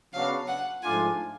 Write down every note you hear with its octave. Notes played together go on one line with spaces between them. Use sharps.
C#3 F#3 B3 D4 F#4 F5
F#5
G#2 F3 A3 D4 F4 G#5